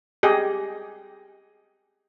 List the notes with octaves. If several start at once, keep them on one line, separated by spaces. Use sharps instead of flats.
G4 G#4 D#5